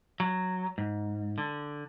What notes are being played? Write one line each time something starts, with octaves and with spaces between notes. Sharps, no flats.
F#3
G#2
D3